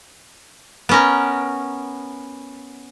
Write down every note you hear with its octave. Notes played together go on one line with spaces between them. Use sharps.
B3 C#4 A#4